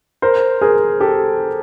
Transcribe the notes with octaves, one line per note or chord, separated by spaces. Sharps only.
A#4 C5
G#4 A#4
G4 A4